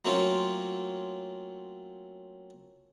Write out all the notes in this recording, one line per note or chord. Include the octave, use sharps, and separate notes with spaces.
F#3 A3 A#3 C4 C#4 F4